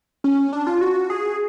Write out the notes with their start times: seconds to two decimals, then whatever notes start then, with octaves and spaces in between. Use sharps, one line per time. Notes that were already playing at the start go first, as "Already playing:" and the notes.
0.24 C#4
0.53 D4
0.67 F4
0.81 F#4
1.10 G#4